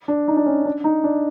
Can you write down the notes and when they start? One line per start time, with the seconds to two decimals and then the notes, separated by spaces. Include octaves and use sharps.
0.08 D4
0.28 D#4
0.37 D4
0.46 C#4
0.65 D4
0.84 D#4
1.04 D4